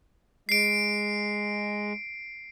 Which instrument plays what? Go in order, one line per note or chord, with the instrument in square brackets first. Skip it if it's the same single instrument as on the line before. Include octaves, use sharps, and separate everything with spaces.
[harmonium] G#3 [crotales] C7 D7